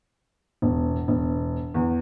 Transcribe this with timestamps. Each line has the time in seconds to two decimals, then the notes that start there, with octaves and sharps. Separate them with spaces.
0.62 E1
1.08 E1
1.74 E2